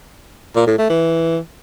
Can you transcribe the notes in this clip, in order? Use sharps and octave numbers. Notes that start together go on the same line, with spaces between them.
A#2
A2
A3
E3